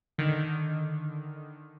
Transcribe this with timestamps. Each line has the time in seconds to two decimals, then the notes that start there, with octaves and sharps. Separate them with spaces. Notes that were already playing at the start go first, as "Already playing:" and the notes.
0.18 D3 D#3